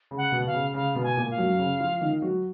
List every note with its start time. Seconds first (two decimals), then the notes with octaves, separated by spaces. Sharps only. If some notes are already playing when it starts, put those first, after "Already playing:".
0.11 C#3
0.17 F#5
0.32 B2
0.45 B2 F5
0.54 C#3
0.74 C#3 F5
0.95 B2 B3
1.03 G#5
1.17 A#2 A#3
1.30 F5
1.37 F#2 F#3
1.59 C#3 C#4
1.80 F3 F4
2.01 D#3 D#4
2.22 F#3 F#4